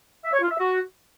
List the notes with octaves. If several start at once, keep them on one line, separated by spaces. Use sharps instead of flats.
E5
C#5
F4
E5
F#4